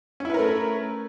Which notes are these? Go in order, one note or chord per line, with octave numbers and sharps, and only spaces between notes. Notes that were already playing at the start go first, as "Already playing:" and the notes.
A3 C#4 E4 A#4 B4